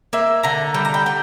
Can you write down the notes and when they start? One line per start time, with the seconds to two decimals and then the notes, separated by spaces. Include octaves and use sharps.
0.13 A#3 E5
0.43 D3 A#5
0.74 G3 G5
0.85 A#5
0.94 G5
1.06 D3 G5